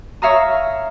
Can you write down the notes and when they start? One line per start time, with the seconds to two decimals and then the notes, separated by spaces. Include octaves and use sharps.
0.22 C#5 E5 F5 A#5 D#6